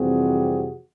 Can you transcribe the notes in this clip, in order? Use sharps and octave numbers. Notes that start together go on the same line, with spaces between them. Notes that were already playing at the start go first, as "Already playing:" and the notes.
Already playing: F2 C3 E3 G3 C4 F#4 G#4